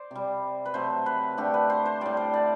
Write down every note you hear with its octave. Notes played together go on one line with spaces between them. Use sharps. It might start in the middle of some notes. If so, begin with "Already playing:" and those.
Already playing: C5 D5
C3 G3
B4
C3 F#3 A3 C5
B4
D3 A3 G4
B4
C5
C5
A2 G3 D5
C5
D5